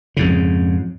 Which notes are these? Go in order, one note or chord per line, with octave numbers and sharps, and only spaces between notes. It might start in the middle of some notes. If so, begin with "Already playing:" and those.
F2 G#2 C#3